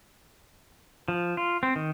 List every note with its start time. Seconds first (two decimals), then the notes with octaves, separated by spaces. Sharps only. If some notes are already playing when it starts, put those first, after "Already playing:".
1.08 F3
1.37 F4
1.63 C4
1.76 D#3